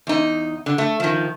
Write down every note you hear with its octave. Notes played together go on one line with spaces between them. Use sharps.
E2 D#4
D3
A3
D#3 F3